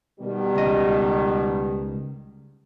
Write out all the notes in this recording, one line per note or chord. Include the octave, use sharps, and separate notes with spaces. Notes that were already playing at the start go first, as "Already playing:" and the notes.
B2 D#3 G3
C#2 D#5